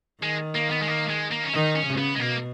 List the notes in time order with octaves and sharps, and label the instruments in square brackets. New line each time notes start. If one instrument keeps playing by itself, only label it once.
[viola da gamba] D#3 [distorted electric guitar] G#3
[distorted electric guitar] A#3
B3
G#3
A#3
G#3
A#3
C#4
[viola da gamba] D#3 [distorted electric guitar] D#4
[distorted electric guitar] C#4
[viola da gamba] C#3
[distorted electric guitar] B3
G#3
[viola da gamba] B2 [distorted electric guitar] A#3